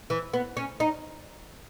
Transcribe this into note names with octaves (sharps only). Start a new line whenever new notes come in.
E3
B3
C#4
D#4